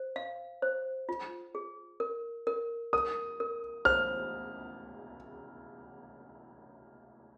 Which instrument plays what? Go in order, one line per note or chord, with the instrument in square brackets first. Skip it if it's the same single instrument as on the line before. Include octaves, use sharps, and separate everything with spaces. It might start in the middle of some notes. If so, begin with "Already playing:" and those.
Already playing: [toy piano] C5
F5
C5
F4
G#4
A#4
A#4
[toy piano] A#4 [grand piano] D#6
[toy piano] A#4
[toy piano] C5 [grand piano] F6